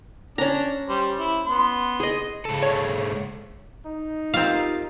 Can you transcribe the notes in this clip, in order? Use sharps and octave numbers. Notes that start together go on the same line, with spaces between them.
C#4 D4 A#5
G3 C5
E4
B3 C6
G#4 D#5
G#2 C#3 A4
C#5
D#4
C4 F4 G4 A#4 F5